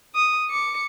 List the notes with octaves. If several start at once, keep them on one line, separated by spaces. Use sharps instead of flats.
D#6
D6 C#7